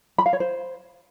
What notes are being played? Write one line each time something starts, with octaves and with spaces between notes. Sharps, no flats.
B5
F5
C#5
C5